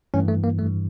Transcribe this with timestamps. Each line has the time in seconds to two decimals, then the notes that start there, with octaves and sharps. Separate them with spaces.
0.14 G2 E3 A3 C#4
0.28 A3
0.44 A#3
0.59 G2 E3 G3 A3